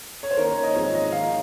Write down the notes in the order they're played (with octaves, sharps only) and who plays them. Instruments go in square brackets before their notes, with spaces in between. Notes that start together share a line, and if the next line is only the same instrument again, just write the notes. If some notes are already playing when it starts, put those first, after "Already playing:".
[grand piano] C#5
C5
D#3 A#3 C#4 A#4
C#5
D#5
G#2 F3 G#3 C4 C#5
D#5
D#3 A#3 F4 F5